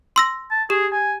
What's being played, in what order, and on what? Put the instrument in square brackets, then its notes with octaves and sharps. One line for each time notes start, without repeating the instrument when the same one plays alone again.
[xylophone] C6 E6 A#6
[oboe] A5
[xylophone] G4 [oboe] G#4
[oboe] G#5